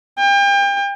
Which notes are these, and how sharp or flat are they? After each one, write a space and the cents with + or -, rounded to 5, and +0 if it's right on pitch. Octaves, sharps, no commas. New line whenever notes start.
G5 +35